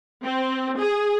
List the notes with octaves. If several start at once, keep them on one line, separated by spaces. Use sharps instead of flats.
C4
G#4